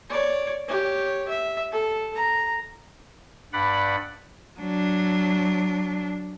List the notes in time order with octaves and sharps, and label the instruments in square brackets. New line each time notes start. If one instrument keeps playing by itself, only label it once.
[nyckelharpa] C#5 D5
G4 C#5
E5
A4
A#5
[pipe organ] G2 D5 F#5 B5
[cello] F#3 D4